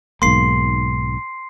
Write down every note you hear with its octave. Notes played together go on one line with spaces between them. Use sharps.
B1 G#2 A#3 C6 C7